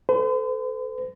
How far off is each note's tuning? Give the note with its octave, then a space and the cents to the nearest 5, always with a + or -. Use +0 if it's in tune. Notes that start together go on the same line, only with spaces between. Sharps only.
A4 +0 C5 -45